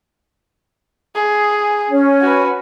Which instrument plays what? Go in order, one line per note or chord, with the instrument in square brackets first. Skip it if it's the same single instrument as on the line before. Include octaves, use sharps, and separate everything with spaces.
[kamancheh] G#4
[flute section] C#4
[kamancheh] F#4 B4